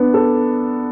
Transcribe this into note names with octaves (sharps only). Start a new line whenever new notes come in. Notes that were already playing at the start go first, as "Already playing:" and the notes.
Already playing: B3 D4
A4